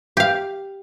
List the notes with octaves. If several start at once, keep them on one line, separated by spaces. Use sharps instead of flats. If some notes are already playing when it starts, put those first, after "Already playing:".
G4 F5